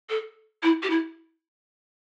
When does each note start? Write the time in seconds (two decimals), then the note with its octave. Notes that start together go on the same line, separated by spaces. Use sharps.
0.09 A4
0.63 E4
0.83 G4
0.90 E4